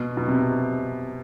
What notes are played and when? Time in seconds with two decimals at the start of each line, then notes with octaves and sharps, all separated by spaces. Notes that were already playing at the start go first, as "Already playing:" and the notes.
Already playing: B2
0.17 B2
0.28 C3